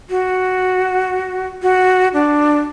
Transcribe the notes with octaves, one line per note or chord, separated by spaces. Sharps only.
F#4
F#4
D4